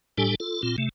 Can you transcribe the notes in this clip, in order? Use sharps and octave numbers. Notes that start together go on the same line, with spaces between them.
A2 G3 D4 G4 A4 G#5
F4 A4
A#2 C4 F4
C3 A3